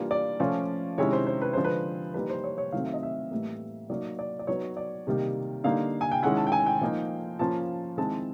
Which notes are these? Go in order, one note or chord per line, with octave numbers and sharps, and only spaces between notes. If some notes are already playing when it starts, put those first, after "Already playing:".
Already playing: E3 G3 A#3 D4 F4
D5
F3 A3 C#4 F4
C3 D#3 G#3 C#4 E4 C#5
C5
C5
B4
D3 F3 G#3 C5
B4
E3 G3 A#3 D#4 B4
C5
C#5
C#5
D#3 F#3 A3 C4 F5
E5
D#5
E5
A2 E3 G3 A#3
F#3 A#3 D#4 D5
D5
D5
F#3 B3 D#4 C#5
D5
C3 D#3 G3 A#3 D#4
D3 G3 A#3 D#4 F5
G#5
G5
D#3 G#3 C#4 E4 F#5
A5
G5
G#5
G5
F3 A#3 D#4
F3 A#3 C#4 F4 A5
D#3 G#3 C4 E4 A5